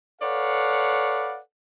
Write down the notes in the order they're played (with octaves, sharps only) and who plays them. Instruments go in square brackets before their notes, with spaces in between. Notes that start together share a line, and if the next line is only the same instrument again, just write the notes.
[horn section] A4 B4 C#5 D5 F5 F#5